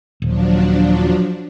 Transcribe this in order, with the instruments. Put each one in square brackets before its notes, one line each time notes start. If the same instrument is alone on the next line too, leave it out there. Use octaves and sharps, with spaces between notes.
[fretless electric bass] D#1 [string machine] F3 F#3 D4